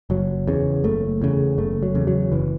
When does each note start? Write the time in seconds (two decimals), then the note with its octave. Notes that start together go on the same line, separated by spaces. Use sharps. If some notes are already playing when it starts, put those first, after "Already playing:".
0.10 F#1 F#3
0.48 E2 C#3
0.84 F#1 A3
1.22 E2 C#3
1.58 F#1 A3
1.83 F#3
1.95 E2 C#3
2.07 F#3
2.32 F#1 E3